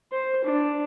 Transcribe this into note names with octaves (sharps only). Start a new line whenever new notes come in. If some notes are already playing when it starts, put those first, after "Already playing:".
C5
D4